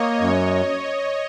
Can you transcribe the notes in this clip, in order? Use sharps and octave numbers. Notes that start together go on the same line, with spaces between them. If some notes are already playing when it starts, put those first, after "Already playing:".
Already playing: A#3 C#5 D#5
F#2 C#5